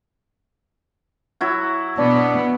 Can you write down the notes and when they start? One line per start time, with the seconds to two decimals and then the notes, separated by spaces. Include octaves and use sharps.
1.41 F#3 E4 F#4
1.98 B2 B3 D4